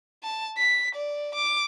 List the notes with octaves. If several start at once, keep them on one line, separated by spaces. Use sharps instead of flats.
A5
B6
D5
D6